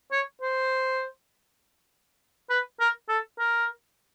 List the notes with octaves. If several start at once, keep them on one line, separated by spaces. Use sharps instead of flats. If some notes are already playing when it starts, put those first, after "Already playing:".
C#5
C5
B4
A#4
A4
A#4